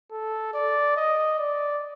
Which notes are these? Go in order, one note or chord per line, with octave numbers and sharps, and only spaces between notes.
A4
D5
D#5
D5